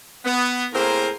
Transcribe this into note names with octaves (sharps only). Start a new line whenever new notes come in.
B3
A2 A#3 C4 G#4 A#4 C5